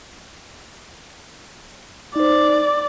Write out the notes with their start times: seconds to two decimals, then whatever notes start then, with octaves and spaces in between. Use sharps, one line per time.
2.16 D#4 C5 D5